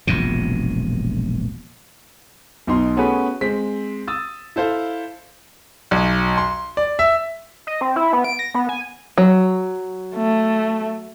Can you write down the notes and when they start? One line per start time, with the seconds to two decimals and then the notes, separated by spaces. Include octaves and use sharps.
0.07 E1 A#1 F#2 C3
2.67 B1 B2 D#4 C6
2.97 A3 B3 C#4 F#4 G#4 B4
3.41 G#3 C4 B6
4.08 D#6 E6 A6
4.56 E4 A4 C5 F5
5.91 B1
6.38 C6
6.77 D5
6.99 E5
7.67 D#5
7.81 C4
7.96 E4
8.13 B3
8.24 D7
8.39 A#6
8.54 B3
8.69 G#5
9.18 F#3
10.15 A3